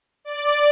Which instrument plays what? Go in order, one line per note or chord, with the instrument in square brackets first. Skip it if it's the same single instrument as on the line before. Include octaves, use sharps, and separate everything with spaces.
[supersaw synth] D5